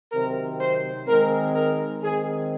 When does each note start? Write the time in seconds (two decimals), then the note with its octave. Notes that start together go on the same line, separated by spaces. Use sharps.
0.12 C3 D#3 F#3 C4 A#4
0.61 C5
1.08 D#3 G#3 C4 A#4
1.55 A#4
2.03 D#3 G#3 C4 G#4